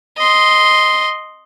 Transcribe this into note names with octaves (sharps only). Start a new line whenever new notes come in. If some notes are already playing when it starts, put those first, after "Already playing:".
D#5 C6